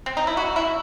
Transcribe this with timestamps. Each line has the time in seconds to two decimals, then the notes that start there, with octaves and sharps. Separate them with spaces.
0.06 C4
0.17 D#4
0.27 E4
0.37 F#4
0.56 E4